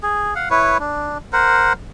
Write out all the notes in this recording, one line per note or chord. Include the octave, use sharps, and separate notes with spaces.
G#4
F5 F#5
E4 B4 C#5
D4
A#4 C5 F#5